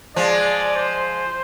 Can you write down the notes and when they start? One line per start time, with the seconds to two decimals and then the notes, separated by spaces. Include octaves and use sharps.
0.16 F3 G#3 D5
0.76 C5